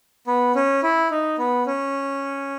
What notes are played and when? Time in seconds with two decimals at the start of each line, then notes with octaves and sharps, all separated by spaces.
0.27 B3
0.55 C#4
0.83 E4
1.11 D#4
1.38 B3
1.66 C#4